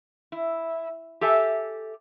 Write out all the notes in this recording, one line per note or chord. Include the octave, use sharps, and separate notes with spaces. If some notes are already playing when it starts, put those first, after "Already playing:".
E4
G4 A4 E5 G#5 A5